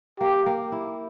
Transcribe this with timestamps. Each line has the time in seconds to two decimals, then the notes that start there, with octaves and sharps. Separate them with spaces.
0.20 A#3 G4
0.46 A#3
0.72 E4